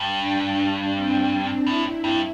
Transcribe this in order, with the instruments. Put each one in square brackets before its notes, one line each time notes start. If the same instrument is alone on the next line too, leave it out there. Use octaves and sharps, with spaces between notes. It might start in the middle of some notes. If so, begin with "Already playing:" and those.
Already playing: [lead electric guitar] G2
[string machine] D4
C4
[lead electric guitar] A2 [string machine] E4
[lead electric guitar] G2